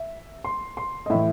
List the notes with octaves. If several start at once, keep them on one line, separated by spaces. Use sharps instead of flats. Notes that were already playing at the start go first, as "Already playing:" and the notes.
Already playing: E5
C6
C6
D#5
A2 E3 E5